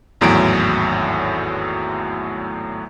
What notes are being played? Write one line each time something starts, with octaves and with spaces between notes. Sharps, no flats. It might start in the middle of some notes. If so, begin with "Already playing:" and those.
G#1 E2 A2 F#3 D7